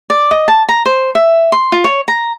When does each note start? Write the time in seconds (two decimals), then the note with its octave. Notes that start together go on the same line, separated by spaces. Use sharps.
0.10 D5
0.31 D#5
0.48 A5
0.69 A#5
0.86 C5
1.15 E5
1.52 C6
1.72 F4
1.84 C#5
2.08 A#5